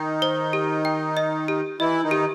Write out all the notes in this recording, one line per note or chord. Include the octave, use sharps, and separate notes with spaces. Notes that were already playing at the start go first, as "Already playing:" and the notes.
Already playing: D#3 D#4 G5
C5
G4
G5
D#5
G4
E3 E4 D#5
D#3 D#4
G4